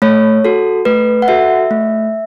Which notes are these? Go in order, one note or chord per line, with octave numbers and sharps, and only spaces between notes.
A3 C#5
F#4 A4
A3 B4
F#5
F#4 A4 E5
A3